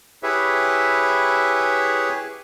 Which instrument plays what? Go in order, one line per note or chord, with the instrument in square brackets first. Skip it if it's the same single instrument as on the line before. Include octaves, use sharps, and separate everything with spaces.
[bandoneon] E4 G4 G#4 B4 C#5 E5